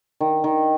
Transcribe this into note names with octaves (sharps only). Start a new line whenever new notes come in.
D#3
D#3